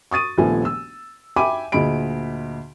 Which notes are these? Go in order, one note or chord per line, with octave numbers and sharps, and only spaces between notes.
C#6 D#6 A6 D#7
D#1 A#1 F3 A3 B3 G#5
E6
E5 G5 G#5 B5 D6 D#7
D2 A#2 G#4 D#5 B5 D7